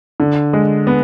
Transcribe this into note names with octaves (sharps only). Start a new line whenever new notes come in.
D3
G#3
B3